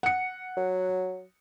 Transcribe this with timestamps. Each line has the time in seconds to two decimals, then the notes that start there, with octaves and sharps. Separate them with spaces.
0.03 F#5 C#7
0.57 F#3